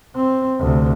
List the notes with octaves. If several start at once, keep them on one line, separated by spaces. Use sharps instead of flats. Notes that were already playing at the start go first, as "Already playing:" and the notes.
C4
D2 C3